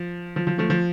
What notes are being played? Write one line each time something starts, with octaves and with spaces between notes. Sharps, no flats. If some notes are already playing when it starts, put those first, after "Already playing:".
Already playing: F3
F3
F3
F3 A3
F3